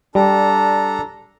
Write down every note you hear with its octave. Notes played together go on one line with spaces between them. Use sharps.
G3 D4 A4 A#5